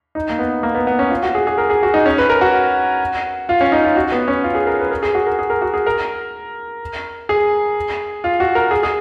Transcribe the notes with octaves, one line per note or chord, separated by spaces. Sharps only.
D#4
A#3
B3
A#3
B3
B3
C#4
F4
F#4
G#4
G#4
A#4
G#4
F#4
D#4
C#4
B4
A#4
F#4
F4
C#4
D#4
F4
F#4
B3
C#4
F4
G#4
A#4
B4
A#4
G#4
F#4
A#4
G#4
A#4
F#4
G#4
A#4
G#4
F4
F#4
A#4
G#4
G#4